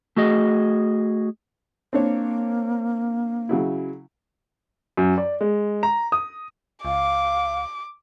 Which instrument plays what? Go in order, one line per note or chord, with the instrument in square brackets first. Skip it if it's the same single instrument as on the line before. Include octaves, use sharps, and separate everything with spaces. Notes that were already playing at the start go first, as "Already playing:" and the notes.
[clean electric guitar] A3 F#4 G#4 D#5
[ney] A#3 [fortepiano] C4 D4 C#5
[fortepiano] C#3 F#3 E4
[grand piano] F#2
D5
G#3
A#5
D#6
[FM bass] C#2 [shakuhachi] F5 [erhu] D6